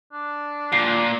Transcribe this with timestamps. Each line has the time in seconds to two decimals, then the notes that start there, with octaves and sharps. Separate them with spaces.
0.12 D4
0.73 A#2 C7